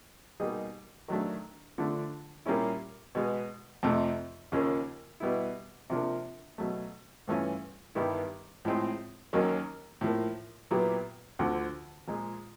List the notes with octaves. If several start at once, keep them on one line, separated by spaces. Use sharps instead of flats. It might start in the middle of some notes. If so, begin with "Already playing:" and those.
B2 G3 A#3 D#4 G#4
D#3 F#3 A3 D4
D3 F3 A3 D4
A#2 G3 A#3 C#4 E4
B2 G#3 B3
F2 C3 F3 A3
D#2 C#3 F3 A#3 C#4
B2 G3 B3 E4
C3 F3 A#3 D4
B2 F#3 A3
G2 E3 A3 C#4 F4
G2 D#3 G3 B3 E4
A2 F3 G#3 C4
D#2 D#3 F#3 A#3 C#4
A2 F3 A#3
A#2 F#3 B3 E4 G4
D2 D3 F3
A#2 F3 G#3